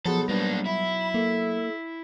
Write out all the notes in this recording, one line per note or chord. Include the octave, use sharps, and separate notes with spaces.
B1 F3 B3 G#4 A4
G3 A#3 D4 B4
E4 B5
A#3 A4